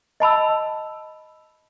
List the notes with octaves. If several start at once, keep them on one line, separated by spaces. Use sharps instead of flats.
D#5 A5 B5 E6